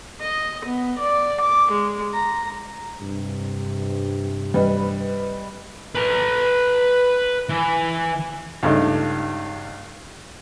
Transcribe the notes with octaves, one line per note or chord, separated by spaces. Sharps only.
D#5
B3
D5
D6
G#3
A#5
G2 C3
G3 B4 D#5
B4 A#5
E3
C#2 G2 A3 D#4